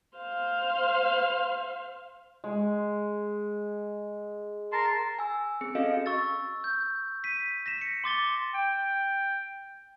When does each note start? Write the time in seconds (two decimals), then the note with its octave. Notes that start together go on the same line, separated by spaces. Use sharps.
0.17 C5 F5
2.44 G#3
4.72 A#4 A5 C6
5.19 G#5 E6
5.61 C4 G#4 C#7
5.75 C#4 F#4 A4 D#5 F5
6.06 C#6 E6 A6
6.64 G6
7.24 B6 D#7
7.66 A#6 B6 E7
7.81 C#7
8.04 C6 D6 A6 G7
8.54 G5